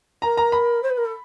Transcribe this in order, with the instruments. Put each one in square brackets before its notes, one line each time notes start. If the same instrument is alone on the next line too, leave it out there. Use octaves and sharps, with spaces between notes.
[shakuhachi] A#4 [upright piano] A#5
[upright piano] A#5
B5
[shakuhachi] C5
B4
A#4
A4